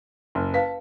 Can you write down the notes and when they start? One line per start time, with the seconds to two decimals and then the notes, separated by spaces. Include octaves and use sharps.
0.35 F#1
0.54 B4 F5 A5 B6